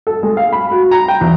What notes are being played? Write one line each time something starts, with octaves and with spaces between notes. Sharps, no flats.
A4
G#3
F5
B5
F#4
A#5
G5
E2